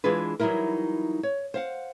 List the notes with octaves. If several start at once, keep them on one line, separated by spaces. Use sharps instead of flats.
E3 G#3 D4 F4 G#4 B4
E3 F#3 G3 D#4 E4 A#4
C#5
C5 F5 F#5